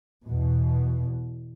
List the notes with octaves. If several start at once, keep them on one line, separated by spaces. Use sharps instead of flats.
E2 B2